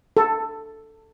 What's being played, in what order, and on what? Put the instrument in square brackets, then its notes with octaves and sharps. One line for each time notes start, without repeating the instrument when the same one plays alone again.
[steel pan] A4